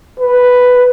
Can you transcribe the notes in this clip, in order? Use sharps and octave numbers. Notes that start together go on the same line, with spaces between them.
B4